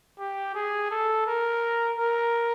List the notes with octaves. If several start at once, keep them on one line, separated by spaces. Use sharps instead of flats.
G4
G#4
A4
A#4
A#4